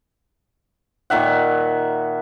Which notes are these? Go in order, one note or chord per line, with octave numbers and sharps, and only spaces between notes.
A#2 D#3 E5 F#5